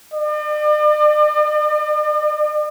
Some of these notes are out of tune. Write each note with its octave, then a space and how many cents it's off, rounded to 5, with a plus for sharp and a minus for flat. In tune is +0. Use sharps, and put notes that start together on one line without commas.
D5 +45